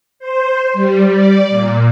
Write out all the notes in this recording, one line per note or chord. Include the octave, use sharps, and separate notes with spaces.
C5
G3
D5
A#2